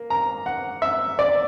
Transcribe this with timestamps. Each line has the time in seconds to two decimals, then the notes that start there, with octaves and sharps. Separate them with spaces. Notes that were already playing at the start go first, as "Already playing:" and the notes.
Already playing: A#3
0.10 A#5
0.46 F#5
0.82 E5
1.19 D5